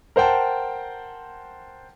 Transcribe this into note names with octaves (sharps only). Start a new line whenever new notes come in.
A#4 C5 F#5 G5 A5